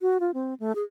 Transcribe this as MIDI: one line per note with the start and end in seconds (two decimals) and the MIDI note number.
0.01 0.18 66
0.20 0.31 65
0.34 0.54 60
0.60 0.72 57
0.75 0.83 68